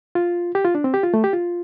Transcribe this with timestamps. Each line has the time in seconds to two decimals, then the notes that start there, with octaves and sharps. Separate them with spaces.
0.15 F4
0.55 G4
0.64 F4
0.75 D4
0.84 C4
0.94 G4
1.03 F4
1.14 A3
1.24 G4
1.33 F4